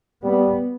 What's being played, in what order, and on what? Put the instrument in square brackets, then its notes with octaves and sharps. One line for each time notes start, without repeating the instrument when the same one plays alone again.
[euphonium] G3 [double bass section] B3